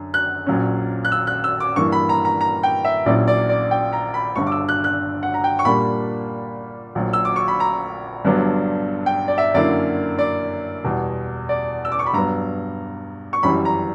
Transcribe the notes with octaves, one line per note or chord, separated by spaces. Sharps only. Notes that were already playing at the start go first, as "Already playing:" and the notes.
Already playing: F#2 D3
F#6
A#1 A#2 F#3 C#4
F#6
E6
F#6
E6
D6
G2 E3 A#3 C#6
B5
A#5
A#5
A#5
G5
E5
A#1 A#2 F#3 C#4 E4 D5
D5
D5
G5
A#5
B5
G1 G2 D3 C#6
D6
E6
F#6
F#6
F#5
A#5
G5
C#6
A#2 G3 A#3 D4 B5
A#1 A#2 F#3
E6
D6
C#6
B5
A#5
G1 G2 F#3 B3 D4
G5
D5
E5
F#2 D3 A#3 C#4 E4 D5
D5
E2 B2 G3
D5
E6
D6
C#6
B5
G2 F#3 B3 A#5
C#6
G1 F#2 E3 G3 B5
A#5